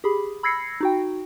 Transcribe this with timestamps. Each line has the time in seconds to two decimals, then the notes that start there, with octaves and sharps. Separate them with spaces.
0.04 G4 G#4 B5
0.43 B5 E6 G#6 A#6 C7 C#7
0.81 D#4 F#4 G5